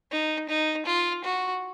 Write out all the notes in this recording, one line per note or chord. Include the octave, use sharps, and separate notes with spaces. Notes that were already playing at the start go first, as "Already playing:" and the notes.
D#4
D#4
F4
F#4